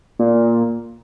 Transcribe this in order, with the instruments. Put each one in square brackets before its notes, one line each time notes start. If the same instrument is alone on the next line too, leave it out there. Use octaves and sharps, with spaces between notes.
[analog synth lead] A#2